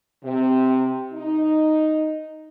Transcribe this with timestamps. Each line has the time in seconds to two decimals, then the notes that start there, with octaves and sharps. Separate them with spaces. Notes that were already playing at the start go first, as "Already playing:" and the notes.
0.24 C3
1.13 D#4